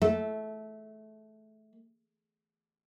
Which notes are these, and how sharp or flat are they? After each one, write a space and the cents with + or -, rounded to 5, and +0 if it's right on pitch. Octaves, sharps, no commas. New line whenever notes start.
A3 -20